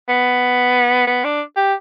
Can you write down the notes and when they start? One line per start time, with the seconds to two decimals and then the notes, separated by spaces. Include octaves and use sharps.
0.09 B3
1.07 B3
1.24 D4
1.56 G4